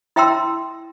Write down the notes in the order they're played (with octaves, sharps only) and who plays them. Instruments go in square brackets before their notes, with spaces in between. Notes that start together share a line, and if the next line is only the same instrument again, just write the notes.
[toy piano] E4 E5 G5 A#5 C6 E6